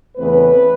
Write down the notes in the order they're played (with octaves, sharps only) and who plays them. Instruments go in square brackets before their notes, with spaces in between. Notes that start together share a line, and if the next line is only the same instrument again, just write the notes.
[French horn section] E2 C#3 E3 A3 C4 B4